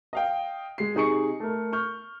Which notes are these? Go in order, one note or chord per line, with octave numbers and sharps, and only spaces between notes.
D#5 F5 G5
G#3 C7
C3 D#4 G#4 C#6 C#7
A3 A#4
C#6 F6 G6